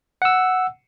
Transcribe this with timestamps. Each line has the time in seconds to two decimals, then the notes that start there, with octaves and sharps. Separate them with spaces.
0.22 F#5 E6